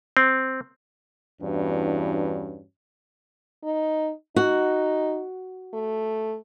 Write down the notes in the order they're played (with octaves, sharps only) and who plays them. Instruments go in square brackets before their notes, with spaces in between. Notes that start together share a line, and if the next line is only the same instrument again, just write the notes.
[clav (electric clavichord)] C4
[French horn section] E2 G2 E3 C#4 D4 F#4
[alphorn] D#4
[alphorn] D#4 [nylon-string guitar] F#4
[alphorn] A3